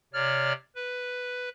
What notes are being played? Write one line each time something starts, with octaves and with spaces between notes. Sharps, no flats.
C3 C#5 D5 F6
B4